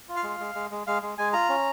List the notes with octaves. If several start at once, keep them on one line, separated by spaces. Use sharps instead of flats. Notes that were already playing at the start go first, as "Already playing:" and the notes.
F4
F5
G#3
G#3
G#3
G#3
G#3 F5
G#3
G#3 G#5
F4 A#5
C#4